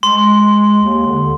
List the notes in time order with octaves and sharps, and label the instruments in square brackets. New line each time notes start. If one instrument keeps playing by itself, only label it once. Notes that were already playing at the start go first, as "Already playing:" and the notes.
[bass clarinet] G#3 [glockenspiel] C6
[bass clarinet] D#2
D3